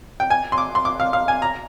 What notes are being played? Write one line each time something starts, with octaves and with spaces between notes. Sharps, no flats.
G5
G#5
C6
D6
C6
D6
F5
F5
G#5
A#5